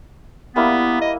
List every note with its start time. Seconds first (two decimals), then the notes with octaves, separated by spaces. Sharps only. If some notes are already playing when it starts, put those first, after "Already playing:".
0.56 G3 A#3 B3 E4
1.01 D#5